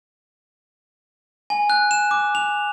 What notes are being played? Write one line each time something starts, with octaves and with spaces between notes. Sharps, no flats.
G#5
F#6
E7
D6
F7